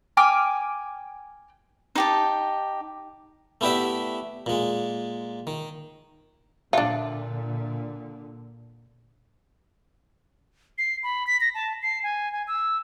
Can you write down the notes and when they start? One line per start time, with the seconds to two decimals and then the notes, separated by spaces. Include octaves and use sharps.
0.17 G5 G#5 D6 F6
1.95 D#4 G4 A5
3.61 A3 B3 E4 G4 D5 E5
4.46 A#2 G#3
5.47 D#3
6.73 A#2 D3 D4 F4 E5
10.78 C7
11.03 B5
11.27 B6
11.41 A#6
11.55 A5
11.82 C7
12.03 G#5
12.32 G#5
12.48 E6